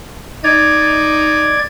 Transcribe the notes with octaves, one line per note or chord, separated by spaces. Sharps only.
D#4 D5 G#6